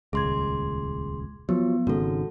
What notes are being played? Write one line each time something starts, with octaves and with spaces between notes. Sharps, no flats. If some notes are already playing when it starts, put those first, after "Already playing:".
D#1 C#2 G#4 C6 G#6
F3 F#3 B3
G#1 G#2 C#3 F#4 A4